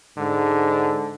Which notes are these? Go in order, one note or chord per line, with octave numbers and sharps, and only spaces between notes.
G#2 D3